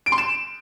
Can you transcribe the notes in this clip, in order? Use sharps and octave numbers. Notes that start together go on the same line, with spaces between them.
D7
C6
E7